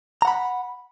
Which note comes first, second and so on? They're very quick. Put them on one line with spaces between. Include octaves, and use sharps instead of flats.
A#5 F#5 B5